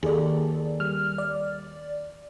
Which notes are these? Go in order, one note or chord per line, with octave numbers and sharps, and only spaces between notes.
D#2 G#4 A4 D5
G3 F6
D5